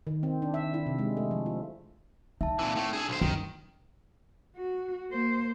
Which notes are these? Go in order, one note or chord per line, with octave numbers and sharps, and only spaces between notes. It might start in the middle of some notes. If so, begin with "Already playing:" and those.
D#3
C4
D4
E5
E4
C3
G#3
A3
F3
F4
D#4 E5 A5
A#2 E3 C4 E6
A2 A3
D4 G#4 A4
B1 C5
F#2 D#3
F#4
A#3 C5